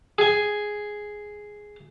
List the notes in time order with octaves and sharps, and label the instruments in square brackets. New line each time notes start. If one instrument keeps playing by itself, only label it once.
[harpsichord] G#4 G#5